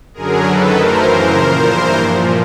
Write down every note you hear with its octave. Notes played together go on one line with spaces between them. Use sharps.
F#2 D3 F#3 G#4 A#4
F#2 D#3 F#3 A4 B4
A2 E3 A#4 C5
F#2 C#3 E3 A#4 C5
A#2 F3
G2 E3 A#4 C5
A#2 F3